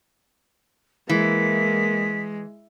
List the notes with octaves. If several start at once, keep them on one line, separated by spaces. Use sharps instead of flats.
E3 G#3 A#3 B6